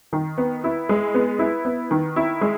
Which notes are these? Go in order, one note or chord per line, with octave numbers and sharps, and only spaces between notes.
D#3
B3
E4
G#3
B3
E4
B3
D#3
E4
G#3